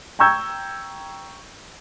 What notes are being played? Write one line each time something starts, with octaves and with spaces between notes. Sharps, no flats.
G5 A#5 C#6 E6 G6 G#6